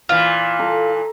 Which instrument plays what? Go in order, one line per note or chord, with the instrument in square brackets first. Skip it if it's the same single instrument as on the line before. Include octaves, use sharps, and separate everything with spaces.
[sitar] A#2 E3 [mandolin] F4
[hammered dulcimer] A4 A#5